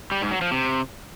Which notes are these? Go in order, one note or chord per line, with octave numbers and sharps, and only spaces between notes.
G3
G#2
F#3
F3
C3